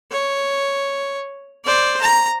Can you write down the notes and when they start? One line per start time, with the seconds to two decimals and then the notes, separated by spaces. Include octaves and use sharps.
0.11 C#5
1.64 C5 D5
2.01 A#5